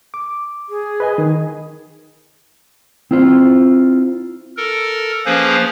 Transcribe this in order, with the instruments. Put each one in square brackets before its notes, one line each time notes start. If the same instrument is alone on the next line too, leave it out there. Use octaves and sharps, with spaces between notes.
[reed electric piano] D6
[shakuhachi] G#4
[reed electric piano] B4 D#5 G#5
D#3
[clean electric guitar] C4 E4 F4 C5
[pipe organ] A4 A#4
F3 A#3 C#4 G#4 B4 C5